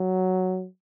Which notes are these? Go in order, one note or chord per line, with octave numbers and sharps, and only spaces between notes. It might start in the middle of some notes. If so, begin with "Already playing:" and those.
Already playing: F#3